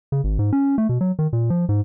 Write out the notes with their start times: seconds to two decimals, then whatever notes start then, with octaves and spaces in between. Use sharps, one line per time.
0.12 C#3
0.24 G#1
0.39 G#2
0.53 C#4
0.78 A3
0.89 B2
1.01 F#3
1.19 D#3
1.33 A#2
1.50 F3
1.69 G#2